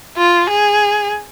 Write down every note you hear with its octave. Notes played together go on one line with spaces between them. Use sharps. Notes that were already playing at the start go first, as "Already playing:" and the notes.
F4
G#4